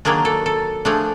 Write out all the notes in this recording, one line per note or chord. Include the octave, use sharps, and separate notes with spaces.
D#3 F#3 A#3 D4 G#4
A4
A4
F3 A3 D4 G#4